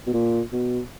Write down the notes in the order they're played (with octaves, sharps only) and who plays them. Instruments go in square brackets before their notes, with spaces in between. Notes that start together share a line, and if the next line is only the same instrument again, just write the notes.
[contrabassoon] B2
A#2
B2